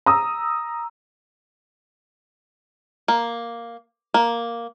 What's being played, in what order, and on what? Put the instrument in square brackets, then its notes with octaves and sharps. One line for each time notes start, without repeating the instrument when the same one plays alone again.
[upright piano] A#5 D#6 E6
[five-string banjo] A#3
A#3